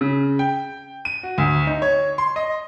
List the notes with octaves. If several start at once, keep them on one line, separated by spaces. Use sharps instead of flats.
C#3
G5
D#7
F#4
D2
D#4
C#5
C6
D#5